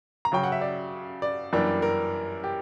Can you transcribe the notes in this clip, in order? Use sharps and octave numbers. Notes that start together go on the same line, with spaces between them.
A#5
C#3 F#3 C#4 G5
F#5
E5
D5
D5
F#2 E3 G3 A#3 D4
A#4
G4